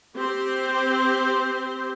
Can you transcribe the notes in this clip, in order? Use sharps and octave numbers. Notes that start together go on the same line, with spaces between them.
C4 G4 C5